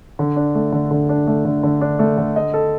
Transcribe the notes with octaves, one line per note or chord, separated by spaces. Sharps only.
D3
D4
A3
D3
D3
D4
A3
D3
D3
D4
A3
D3
D#5
A4